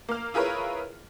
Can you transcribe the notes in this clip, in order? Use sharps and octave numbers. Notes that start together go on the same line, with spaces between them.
A#3 F6
E4 F4 G#4 A#4 B4 C#5